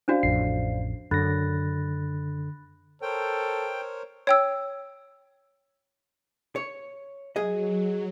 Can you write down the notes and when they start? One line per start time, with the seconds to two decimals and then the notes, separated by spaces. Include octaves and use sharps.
0.08 C#4 D4 F#4 C5 D5 F5
0.23 A1 F2 C7
1.11 F#2 D3 B5 F#6 A6 A#6
3.02 A4 A#4 C5 C#5 G5
4.27 C#5 G5 E6
6.56 C#5
7.36 F#3 G#4 D#5